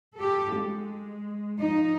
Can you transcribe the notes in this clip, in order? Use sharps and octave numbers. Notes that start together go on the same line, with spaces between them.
G4 A4
G#3
F3 D#4